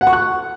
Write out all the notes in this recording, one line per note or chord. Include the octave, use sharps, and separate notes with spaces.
F#5
C#6
F#6